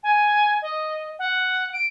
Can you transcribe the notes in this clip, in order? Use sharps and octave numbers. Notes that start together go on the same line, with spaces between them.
G#5
D#5
F#5
D7